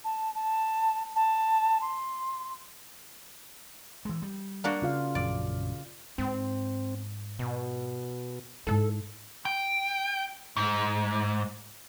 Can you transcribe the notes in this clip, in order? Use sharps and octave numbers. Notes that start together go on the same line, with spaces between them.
A5
A5
A5
C6
E3 G#3
G3
A#3 D4 F#4
C#3 F4 F5
A#1 F#2 D5
G#2 C4
B2
G#2 E4 A4
G5
G#2